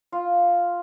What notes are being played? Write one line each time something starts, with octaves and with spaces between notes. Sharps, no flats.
F4